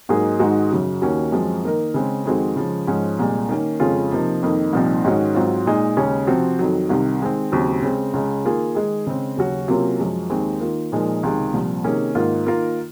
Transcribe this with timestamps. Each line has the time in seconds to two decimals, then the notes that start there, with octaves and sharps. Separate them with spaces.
0.09 G#2 F#3 A#3 D#4 G#4
0.40 G#2 D#3 G#3 D#4 F#4
0.71 F#2 C#3 F#3
1.02 D#2 D#3 A#3 C#4 F#4
1.32 F#2 F3 G#3 C4
1.64 D#3 A#3 D#4 A#4
1.94 C#3 G#3 C4
2.25 F2 D#3 G#3 C4 F#4
2.56 C#3 F3 G#3
2.87 G#2 F3 G#3 C#4
3.19 C2 A#2 G#3
3.49 D#3 A#3 C#4
3.80 F2 C#3 G#3 C#4 F4
4.12 C3 F3 A#3 D#4
4.43 F2 D#3 A#3 D#4
4.73 C2 A#2 F3 C4 D#4
5.04 G#2 D#3 G#3 C#4 F#4
5.34 G#2 F#3 C4 F4
5.66 A#2 G#3 D#4
5.97 D#2 C#3 G#3 C#4
6.27 C3 F3 C4 F#4
6.59 F2 D#3 F#3
6.89 C2 C3 D#3
7.20 D#3 G#3 C4
7.52 D#2 C#3 F#3 C4
7.82 C#3 G#3 C4
8.13 C#2 C#3 G#3
8.44 D#3 A#3 F4 G#4
8.75 D#3 G#3 D#4 G#4
9.07 C#3 G#3 C4
9.37 D#2 C#3 F#3 C#4 F#4
9.68 C3 F#3 A#3 C#4 F4
9.99 F#2 F3 G#3
10.30 D#2 D#3 G#3 C4
10.61 D#3 A#3 F4
10.92 A#2 F3 G#3 D#4 A#4
11.23 C#2 C3 D#3 G#3
11.53 C2 A#2 F3
11.84 C3 D#3 A#3 C#4 G#4
12.15 G#2 D#3 A#3 F4
12.46 D#3 A#3 F4 A#4